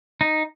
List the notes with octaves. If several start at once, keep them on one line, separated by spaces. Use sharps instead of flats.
D#4